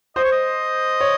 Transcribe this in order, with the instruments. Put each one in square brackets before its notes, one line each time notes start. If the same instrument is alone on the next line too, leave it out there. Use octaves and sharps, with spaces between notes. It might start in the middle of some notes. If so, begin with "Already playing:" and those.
[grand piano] C5 [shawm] D#5
[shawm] C#5
D#5
[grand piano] C#5